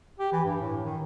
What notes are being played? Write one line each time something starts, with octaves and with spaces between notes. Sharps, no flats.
G4
E3
G2
A2
D#3